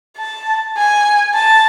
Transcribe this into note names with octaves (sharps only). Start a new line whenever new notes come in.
A5
G#5
A5